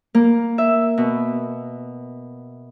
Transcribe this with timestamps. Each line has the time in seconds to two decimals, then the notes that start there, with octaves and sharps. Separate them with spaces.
0.15 A#3
0.58 E5
0.98 B2